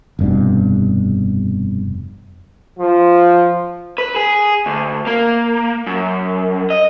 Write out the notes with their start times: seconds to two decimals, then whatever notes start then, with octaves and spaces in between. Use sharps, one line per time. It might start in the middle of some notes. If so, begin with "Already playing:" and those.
0.19 F1 G2 B2
2.79 F3
3.98 B4
4.16 G#4
4.66 D2
5.07 A#3
5.87 F#2
6.70 D#5